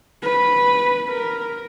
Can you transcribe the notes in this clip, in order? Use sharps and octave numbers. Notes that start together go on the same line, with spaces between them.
B4
A#4